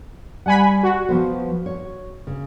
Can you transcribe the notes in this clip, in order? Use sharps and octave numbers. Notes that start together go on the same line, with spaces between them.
G3 F#5 G#5 B5
F#4
F3 B3 C5
C#5
C#3